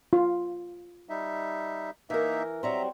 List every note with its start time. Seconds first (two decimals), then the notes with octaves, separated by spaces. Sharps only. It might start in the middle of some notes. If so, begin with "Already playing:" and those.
0.13 F4
1.09 G3 D#4 E5
2.10 E3 A#3 D#4 A#4 E5
2.63 F#3 G3 C4 E5 A#5